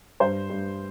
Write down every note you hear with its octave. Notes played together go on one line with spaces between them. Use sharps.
G2 C5
G2